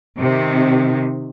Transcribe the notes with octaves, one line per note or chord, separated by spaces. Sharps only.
C3 D#3